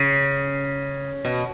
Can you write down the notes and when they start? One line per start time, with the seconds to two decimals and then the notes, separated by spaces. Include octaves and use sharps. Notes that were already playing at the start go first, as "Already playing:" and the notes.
Already playing: C#3
1.25 B2